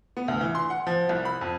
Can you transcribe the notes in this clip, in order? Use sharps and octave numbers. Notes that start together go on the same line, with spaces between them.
B3
D2
E3
C6
F#5
F3
C2
B5
F2